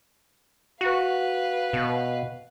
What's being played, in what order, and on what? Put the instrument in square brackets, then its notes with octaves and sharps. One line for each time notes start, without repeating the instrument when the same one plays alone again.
[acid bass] F#4 [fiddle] B4 F5
[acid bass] B2